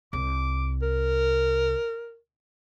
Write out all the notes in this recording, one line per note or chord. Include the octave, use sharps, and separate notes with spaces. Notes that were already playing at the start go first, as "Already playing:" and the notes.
C2 D6
A#4